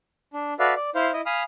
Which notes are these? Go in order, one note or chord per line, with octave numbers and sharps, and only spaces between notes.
D4
F#4 A4 B4 D5 E5 F5
D5
E4 C5 F5
E4 D#5
F5 G#5 B5 D#6 F6